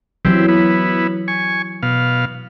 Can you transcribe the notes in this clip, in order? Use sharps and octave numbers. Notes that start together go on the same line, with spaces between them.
E3 F#3 C4 E4 G4
B3 E4
G#5 C#6
B2 F5